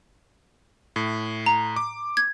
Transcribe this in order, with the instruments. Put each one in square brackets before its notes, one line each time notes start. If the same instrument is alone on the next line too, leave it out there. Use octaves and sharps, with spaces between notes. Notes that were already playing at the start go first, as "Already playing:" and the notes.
[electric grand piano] A2
[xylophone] A#5
[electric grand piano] D6
[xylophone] G#6